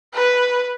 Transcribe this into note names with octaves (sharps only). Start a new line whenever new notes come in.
B4